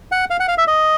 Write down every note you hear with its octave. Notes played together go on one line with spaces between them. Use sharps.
F#5
F5
F#5
F5
E5
D#5